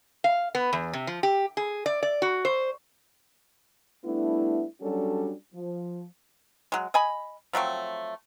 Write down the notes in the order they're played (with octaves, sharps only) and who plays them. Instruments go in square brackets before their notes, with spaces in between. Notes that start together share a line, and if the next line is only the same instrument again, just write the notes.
[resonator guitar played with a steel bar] F5
B3
E2
C3
F3
G4
G#4
D5
D5
F#4
C5
[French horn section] G3 A3 B3 D4 E4
F#3 G3 C#4 D4 F#4 A4
F3
[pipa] F#3 G#3
D#5 G#5 B5
F3 F#3 A3 C4